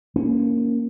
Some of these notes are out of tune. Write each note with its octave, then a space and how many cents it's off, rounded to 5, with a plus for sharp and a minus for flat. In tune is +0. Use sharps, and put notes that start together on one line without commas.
A#3 +0 C#4 +10